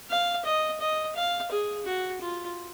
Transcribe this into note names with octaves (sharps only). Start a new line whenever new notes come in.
F5
D#5
D#5
F5
G#4
F#4
F4